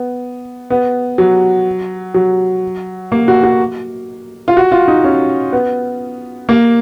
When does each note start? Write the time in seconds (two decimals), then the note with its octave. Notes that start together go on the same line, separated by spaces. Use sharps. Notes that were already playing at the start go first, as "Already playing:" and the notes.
Already playing: B3
0.70 B3
1.18 F#3
2.14 F#3
3.12 A#3
3.28 F#4
3.43 F#4
4.48 F4
4.57 F#4
4.72 F4
4.88 D#4
5.04 C#4
5.53 B3
6.49 A#3